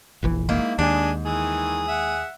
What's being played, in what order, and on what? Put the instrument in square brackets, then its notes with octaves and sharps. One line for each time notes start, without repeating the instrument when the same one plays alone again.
[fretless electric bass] F1 A#1 E3
[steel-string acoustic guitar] G#2 A#3 E4
[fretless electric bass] D#2 [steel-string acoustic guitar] G#2 [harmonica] G#3 G#4 G#5 [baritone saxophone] D4
[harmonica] D#3 E3 [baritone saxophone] G#4
[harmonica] E5 F#5